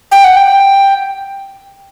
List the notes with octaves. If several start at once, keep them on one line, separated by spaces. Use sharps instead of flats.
G5
F#5
G5